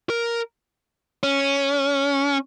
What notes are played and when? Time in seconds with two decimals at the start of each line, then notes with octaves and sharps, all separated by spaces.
0.10 A#4
1.23 C#4